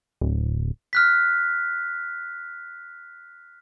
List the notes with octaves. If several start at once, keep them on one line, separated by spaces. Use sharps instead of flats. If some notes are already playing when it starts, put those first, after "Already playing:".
D1
F6 F#6 B6